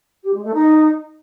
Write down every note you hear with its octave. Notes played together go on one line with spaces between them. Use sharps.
G4
G#3
A3
D#4